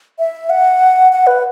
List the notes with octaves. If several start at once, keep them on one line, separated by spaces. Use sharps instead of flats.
E5
F#5
F#5
B4